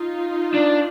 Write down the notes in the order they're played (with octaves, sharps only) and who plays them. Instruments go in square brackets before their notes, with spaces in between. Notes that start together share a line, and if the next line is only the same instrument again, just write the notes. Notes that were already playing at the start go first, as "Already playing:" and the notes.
Already playing: [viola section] D#4 F4
[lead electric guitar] D4